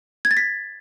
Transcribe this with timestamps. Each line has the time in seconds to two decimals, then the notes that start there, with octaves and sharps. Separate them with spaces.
0.25 G#6
0.31 A6
0.37 B6